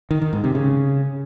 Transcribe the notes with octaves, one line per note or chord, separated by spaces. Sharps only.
D#3
D#3
G#2
C3
C#3